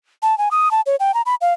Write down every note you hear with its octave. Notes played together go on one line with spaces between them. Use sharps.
A5
G#5
D#6
A5
C#5
G5
A#5
B5
F5